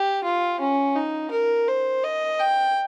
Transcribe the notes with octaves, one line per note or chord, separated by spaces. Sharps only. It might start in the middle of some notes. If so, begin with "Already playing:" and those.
Already playing: G4
F4
C#4
D#4
A#4
C5
D#5
G5